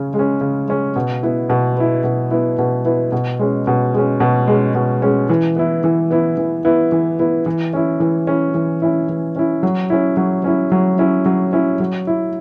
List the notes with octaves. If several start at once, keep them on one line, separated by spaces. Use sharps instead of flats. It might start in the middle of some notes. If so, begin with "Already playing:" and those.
Already playing: C#3 C#4
G#3
C#4
C#3
G#3 C#4
B2
B3 E4
B2
B3 E4
B2
B3 E4
B2
B3 E4
B2
G#3 C#4
B2
G#3 C#4
B2
G#3 C#4
B2
G#3 C#4
E3
B3 E4
E3
B3 E4
E3
B3 E4
E3
B3 E4
E3
C#4 E4
E3
C#4 E4
E3
C#4 E4
E3
C#4 E4
F#3
C#4 E4
F#3
C#4 E4
F#3
C#4 E4
F#3
C#4 E4
F#3
E4